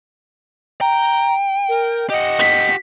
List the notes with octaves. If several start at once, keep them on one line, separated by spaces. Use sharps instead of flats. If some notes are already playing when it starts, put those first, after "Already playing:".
G5 A#5
A#4
G4 D#5 F#5
B6